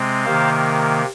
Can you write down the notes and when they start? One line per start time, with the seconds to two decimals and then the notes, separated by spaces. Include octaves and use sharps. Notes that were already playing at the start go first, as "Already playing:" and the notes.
Already playing: C3 G#3 C4
0.25 C3 D#3 A#3 C5 F5